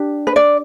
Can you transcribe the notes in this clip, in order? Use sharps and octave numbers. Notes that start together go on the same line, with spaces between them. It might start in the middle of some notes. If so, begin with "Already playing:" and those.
Already playing: D4 G4
B4
D5